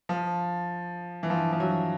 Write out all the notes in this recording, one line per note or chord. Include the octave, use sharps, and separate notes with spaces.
F3
E3
F3
F3
F#3